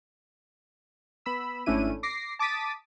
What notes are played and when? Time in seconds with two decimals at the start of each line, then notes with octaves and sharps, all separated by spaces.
1.26 B3 B5 E6
1.66 G#1 A3 C#4 D4 E4 D#7
2.03 D6 A#6 C7
2.39 A5 D6 D#6 A6 B6 D#7